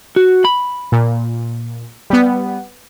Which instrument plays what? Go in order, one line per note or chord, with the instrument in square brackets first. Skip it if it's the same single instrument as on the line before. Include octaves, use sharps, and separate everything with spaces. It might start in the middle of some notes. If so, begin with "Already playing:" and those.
[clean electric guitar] F#4
B5
[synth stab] A#2
G3 B3